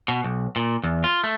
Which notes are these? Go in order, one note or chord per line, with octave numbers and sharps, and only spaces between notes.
B2
B1
A#2
E2
F4
A3